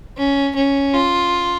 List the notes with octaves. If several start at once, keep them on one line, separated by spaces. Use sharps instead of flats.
C#4
C#4
F4